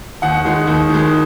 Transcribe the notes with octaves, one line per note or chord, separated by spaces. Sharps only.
D#2 F#5
D#3 G#3
D#2
D#3 G#3